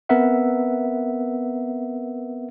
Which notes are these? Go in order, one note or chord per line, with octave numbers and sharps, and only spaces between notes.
B3 C4 A#4 B4 E5 F#5